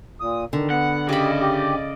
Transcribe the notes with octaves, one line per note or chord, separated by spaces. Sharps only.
A#2 D#6
D3 D#3
B3 F#5
C#3 G4 D5 D#5 B5
G4